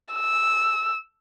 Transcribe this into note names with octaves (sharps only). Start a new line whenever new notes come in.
E6